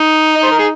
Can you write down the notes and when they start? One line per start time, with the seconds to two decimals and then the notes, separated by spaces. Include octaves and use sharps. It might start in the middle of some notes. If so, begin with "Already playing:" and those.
Already playing: D#4
0.35 D#5
0.43 C5
0.51 A#4
0.59 G#4